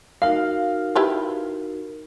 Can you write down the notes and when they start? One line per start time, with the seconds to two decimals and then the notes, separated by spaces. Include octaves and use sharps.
0.22 D#4 F#4 A#4 F5
0.96 E4 G4 B4